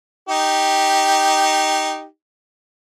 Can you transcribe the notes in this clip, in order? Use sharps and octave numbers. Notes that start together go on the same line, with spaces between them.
D#4 G4